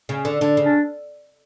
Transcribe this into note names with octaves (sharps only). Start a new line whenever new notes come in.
C#3
D3
D3 D4
C#3
D4